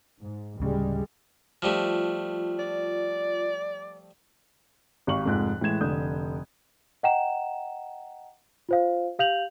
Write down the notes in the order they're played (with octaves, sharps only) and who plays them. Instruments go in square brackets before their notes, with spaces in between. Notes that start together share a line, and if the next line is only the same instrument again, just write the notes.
[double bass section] G#2
[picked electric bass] D1 C#3 [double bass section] G3 G#3
[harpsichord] F3 G3 A3 [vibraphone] F4
[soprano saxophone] D5
[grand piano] G#1 G4 F5 C#6 F#7
F1 F2 G#2 F3 F#6
A2 E3 G#3 G#6 E7
F1 D3 D#6 G6
[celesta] D#5 F#5 G5 A#5 E7
F4 C5 F5
G4 F5 G6 F7 F#7